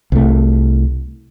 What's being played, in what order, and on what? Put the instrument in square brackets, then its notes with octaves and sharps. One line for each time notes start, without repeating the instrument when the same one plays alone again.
[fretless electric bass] C2 A3